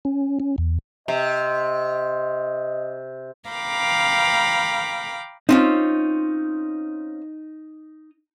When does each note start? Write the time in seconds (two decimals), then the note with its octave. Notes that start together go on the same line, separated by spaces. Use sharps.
0.05 C#4
0.40 C#4
0.58 E2
1.08 C3 D#5
3.50 F5 G5 A#5 B5 D6
5.49 C4 C#4 D#4 F4